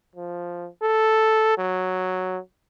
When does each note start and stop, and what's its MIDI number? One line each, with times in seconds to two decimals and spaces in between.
0.15 0.69 53
0.82 1.56 69
1.58 2.39 54